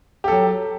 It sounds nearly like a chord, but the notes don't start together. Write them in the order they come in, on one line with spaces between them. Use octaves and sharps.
G4 A4 F#3